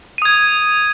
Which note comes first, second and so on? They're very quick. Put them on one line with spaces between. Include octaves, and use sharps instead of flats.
D#7 D#6 G#6